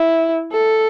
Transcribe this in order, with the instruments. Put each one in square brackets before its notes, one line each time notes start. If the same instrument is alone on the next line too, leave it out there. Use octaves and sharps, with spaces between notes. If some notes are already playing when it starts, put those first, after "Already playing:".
Already playing: [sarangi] E4
A4